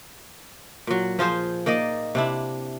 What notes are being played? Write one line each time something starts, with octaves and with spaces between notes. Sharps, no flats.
A#2 F#3
F3 F4 G#4 C5
A#3 D#4 D5 D#5
C3 D4 E4